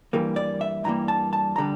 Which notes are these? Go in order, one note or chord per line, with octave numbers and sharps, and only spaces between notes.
G2 E3 G3 A#3
D5
E5
G2 E3 G3 A#3 A#5
A5
A5
D3 G3 A#5